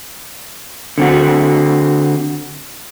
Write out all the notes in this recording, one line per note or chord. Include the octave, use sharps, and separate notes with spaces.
D3 C4 F#4